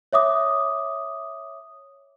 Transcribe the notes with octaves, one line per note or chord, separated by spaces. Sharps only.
C#5 E5 D6 D#6